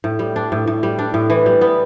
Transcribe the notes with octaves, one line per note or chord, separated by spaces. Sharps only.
A2
G3
D4
A2
A2
G3
D4
A2
E3
G3
B3